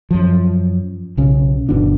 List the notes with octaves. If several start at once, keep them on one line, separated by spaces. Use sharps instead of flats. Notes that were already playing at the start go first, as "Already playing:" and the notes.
F#2 F3
B1 C#3
G1 B2 E3 D4